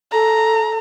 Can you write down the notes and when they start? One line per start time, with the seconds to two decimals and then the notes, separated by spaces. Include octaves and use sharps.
0.12 A4 A#5